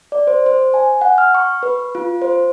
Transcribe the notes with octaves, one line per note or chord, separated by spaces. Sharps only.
D5
C5
C5
G#5
F#5
F6
C#6
B4
F4
C5